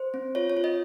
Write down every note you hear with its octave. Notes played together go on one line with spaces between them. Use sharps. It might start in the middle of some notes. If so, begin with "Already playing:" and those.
Already playing: C5
C4
F4 C#5
C#5
F4
D#5